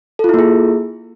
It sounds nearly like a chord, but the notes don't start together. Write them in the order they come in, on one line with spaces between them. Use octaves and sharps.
A4 F4 E4 A#3 G#4